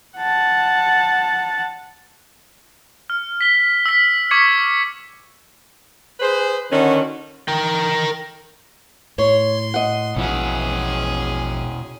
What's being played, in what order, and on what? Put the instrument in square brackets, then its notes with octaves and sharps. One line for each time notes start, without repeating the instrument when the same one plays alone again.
[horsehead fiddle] F#5 A5
[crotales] F6
B6 G7
E6 B6
C#6 D6 G#6 B6 C#7
[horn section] G#4 B4 C5
D3 D#3 C#4 F#4
[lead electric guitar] A#4 G5
[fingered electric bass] A2 [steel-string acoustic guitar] C#5 [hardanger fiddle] C6
[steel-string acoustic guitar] D#5 F#5
[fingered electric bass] A#1 [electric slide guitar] B2 E4 F#4 [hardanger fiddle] C#4 G#4